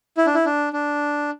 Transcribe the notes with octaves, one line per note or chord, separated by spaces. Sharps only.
E4
D4
E4
D4
D4